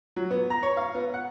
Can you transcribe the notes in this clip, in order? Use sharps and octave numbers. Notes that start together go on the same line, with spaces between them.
F#3
B3
A#5
C#5
F5
B3
F#5